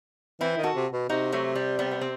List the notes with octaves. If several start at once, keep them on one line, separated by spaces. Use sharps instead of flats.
E3 C4 E4
D#3
F#4 A4
C3
B2
C3 D#4 F#4
F#3 A3
G3
G3 B3
B3
C4